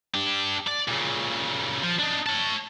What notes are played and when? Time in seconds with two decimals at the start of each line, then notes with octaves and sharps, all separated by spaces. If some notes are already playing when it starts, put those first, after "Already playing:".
0.14 D4 G4
0.67 D5
0.88 A#2 C#3
1.83 F3
1.99 D4 D#4
2.26 C#5 A5